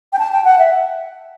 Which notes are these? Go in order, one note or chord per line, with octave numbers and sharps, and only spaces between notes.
G5
A5
G5
F#5
E5